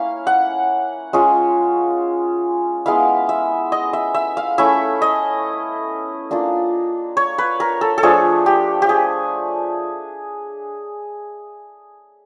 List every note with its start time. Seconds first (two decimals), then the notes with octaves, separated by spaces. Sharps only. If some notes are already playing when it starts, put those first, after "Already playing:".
Already playing: A#3 C#4 E4 F5
0.27 F#5
1.13 G#3 C#4 F4
2.86 G#3 B3 E4 F5
3.29 E5
3.72 D#5
3.93 E5
4.14 E5
4.37 F5
4.58 A3 C#4 E4 E5
5.02 D#5
6.31 A#3 D4 F4
7.17 C#5
7.38 B4
7.60 A#4
7.81 A4
7.98 A4
8.03 F3 A3 D4 G#4
8.46 G4
8.82 G4
8.89 G#4